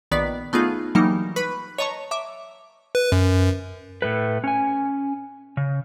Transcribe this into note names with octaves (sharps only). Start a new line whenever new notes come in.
A#1 D#3 B3 D5 B6
A3 B3 D#4 F4 G#4
E3 F#3 G3 A#3 D#4
B4 B5 C#6 F#6 B6
C#5 D#5 A5 A#5 C#6
E5 D6
B4
F#2
A2 A3 B4
C#4 G#5
C#3